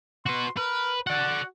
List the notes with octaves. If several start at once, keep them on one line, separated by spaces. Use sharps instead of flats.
F#4 B4 C6
A#4 B4
F#4 D5 F#5